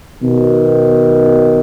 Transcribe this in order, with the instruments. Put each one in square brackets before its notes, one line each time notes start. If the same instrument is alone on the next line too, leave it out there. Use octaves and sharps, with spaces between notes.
[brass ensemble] B2 D#3